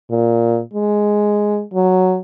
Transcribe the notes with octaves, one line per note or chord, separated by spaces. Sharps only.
A#2
G#3
F#3